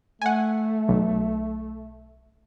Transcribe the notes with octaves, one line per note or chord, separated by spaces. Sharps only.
A3 F#5 G#5
B1